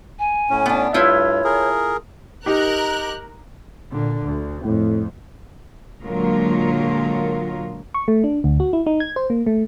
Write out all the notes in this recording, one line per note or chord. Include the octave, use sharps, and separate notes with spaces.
G#5
A2 C#4
B3 D4
G2 A3 E4 F4 C#5
G#4 A#4
D#4 G4 A#4 F#6
A#2 D3
D2
F2 A2
A#2 D3 F#3 G#3 F4 A#4
C#6
A3
D4
D2
F#4
E4
D#4
G#6
C5
A#3
A3